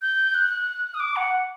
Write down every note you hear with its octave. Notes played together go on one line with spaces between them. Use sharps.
G6
F#6
D#6
D6
F#5